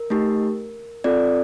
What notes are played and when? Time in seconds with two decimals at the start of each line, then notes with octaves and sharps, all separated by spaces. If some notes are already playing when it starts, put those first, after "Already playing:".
Already playing: A#4
0.10 A3 D#4 G4
1.04 C4 F4 A4 D5